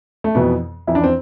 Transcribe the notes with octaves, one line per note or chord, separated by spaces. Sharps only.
A3
F2 B2 E3 B3
F2 E3 E4
D4
C4